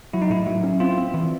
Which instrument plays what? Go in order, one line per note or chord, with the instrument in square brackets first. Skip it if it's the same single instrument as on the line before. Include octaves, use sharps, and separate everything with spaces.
[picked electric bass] F#3 [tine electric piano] E4
[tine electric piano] D#4
[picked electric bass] A2 [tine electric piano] E4
[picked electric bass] F#3
C#4
[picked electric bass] C4 [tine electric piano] F4
[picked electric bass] C4
E3